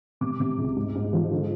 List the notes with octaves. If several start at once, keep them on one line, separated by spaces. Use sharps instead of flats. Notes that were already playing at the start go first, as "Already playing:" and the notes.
C3 D6
C3
C#2
G#2
G#2
F3
D3